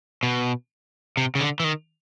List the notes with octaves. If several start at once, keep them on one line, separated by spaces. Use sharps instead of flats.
B2
C3
C#3
D3
E3
D#3